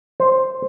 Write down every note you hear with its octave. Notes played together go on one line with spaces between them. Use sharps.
C5